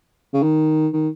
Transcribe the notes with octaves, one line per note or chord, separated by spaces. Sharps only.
C#3
D#3
D#3